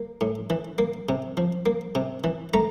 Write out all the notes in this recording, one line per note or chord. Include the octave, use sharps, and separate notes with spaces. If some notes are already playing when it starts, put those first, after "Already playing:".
Already playing: A#3
A2
E3
A#3
C3
F3
A#3
C3
E3
A3 A#5